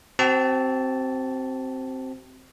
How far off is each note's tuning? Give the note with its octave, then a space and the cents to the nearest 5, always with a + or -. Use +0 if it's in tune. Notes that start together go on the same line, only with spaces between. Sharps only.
C4 +0 F#4 +45 A5 +0